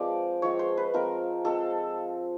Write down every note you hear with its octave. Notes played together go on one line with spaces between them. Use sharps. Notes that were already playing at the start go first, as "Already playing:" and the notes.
Already playing: F3 G#3 C4 D5
F3 G#3 C4 C#5
C5
B4
F3 G#3 C4 A#4
F3 G#3 C4 A4